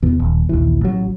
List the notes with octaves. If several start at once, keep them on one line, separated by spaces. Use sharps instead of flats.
E2 B2
D#1
A#1 D#2 E3
A1 F#3